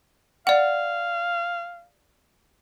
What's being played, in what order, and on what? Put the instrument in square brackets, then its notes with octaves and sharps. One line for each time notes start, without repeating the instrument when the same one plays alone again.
[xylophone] D5 F#5 [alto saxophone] F5